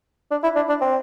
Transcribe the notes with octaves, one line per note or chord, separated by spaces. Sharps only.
D4
E4
D4
D4
C4